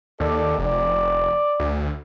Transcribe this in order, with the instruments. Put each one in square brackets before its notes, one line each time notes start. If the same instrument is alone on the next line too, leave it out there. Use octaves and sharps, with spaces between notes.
[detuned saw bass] D#2 [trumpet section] A4 D5
[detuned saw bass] F1 [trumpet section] D5
[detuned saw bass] D2